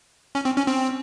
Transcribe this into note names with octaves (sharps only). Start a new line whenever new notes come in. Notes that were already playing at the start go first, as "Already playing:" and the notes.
C#4
C4
C#4
C4